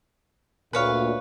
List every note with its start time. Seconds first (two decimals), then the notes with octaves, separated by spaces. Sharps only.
0.73 D2 A#2 B4 C#5 F5